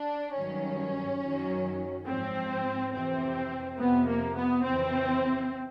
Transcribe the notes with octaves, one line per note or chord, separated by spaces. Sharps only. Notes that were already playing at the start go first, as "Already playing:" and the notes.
Already playing: D4
G2 D#3 F#3 C#4
F#2 D#3 F#3
G#2 F3 C4
F2 C3 E3 C4
F2 C3 F3 B3
A#3
B3
F2 C#3 E3 C4